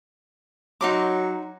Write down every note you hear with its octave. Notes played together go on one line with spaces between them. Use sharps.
F#3 D#4 C6 D6